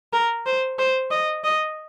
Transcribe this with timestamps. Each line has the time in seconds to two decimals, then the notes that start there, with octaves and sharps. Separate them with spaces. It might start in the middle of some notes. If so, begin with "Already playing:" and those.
0.13 A#4
0.46 C5
0.79 C5
1.11 D#5
1.44 D#5